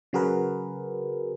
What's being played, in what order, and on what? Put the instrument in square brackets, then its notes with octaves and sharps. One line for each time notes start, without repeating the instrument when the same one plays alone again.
[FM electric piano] C#3 F#3 F#4 G#4 A#4 B4